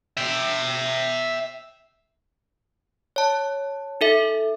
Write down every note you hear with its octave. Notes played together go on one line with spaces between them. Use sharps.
E5 G5
C#5 A5
D#4 A4 E5